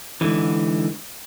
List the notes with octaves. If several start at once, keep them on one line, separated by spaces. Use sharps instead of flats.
G#2 B2 D3 E3